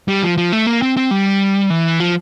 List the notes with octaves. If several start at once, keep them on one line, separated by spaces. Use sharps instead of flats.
G3
F3
F3
A3
A#3
C4
C4
G3
E3
F3